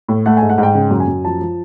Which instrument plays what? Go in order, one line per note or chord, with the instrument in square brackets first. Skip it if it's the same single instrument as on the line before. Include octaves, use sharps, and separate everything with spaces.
[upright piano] A2
A3 F#5
G#2 G#5
F#5
G#2
G5
C#3 G5
F#2
G#5
F#2
F3 A5
F3